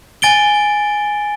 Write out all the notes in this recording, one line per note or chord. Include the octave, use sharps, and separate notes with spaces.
G#5 A6 D7 G7